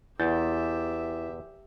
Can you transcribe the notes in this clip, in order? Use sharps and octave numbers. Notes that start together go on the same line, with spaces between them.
E2 E4 G4 E5 G6 A6